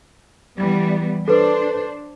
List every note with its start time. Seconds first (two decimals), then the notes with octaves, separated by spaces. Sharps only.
0.57 E3 G3 B3
1.28 D4 A4 B4 C5